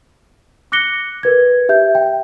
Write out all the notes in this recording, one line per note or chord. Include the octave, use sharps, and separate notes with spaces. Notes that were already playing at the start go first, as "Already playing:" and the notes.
D6 F#6 A#6 C#7 G7
A#4 B4 G#6
G4 E5 G6
G5